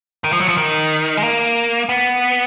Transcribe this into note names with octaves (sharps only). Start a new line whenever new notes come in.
D#3
F3
F#3
F3
D#3
G#3
A#3
B3